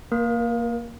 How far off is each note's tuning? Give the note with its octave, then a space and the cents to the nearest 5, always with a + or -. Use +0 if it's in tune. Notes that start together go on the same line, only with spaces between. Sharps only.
A#3 +0 A#4 +35